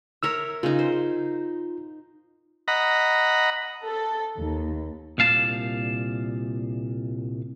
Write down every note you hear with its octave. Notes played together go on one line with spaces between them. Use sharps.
A#4 C#5 E5 E6
C#3 D#4 F4
C5
D#5 F#5 A#5 B5
A4
D#2
C2 A#2 F5 A5